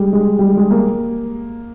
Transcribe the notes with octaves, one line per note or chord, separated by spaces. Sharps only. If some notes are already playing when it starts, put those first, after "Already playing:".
Already playing: G3 G#3
G#3
G3
G#3
G#3
A#3